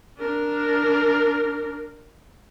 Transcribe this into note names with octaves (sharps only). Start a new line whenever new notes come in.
D4 A#4